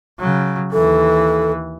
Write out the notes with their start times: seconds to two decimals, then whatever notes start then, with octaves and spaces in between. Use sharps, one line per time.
0.19 C#3 F#3
0.72 D#2 E3 A4